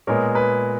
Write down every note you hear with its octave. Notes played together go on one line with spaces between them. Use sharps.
A#2 G#3 B3 A#4 C#5
B4